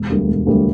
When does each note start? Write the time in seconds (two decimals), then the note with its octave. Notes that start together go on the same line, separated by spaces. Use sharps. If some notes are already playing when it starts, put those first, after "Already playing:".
Already playing: E1
0.10 D2 D3 G3 A#3
0.28 E1
0.47 D2 D3 G3 A#3